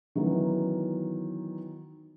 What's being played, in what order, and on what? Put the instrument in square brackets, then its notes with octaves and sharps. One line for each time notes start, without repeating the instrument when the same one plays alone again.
[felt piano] D#3 E3 F#3 B3